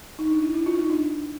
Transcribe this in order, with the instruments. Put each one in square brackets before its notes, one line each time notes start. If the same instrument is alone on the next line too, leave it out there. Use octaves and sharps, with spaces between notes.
[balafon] D#4
D4
E4
E4
F4
D#4
D4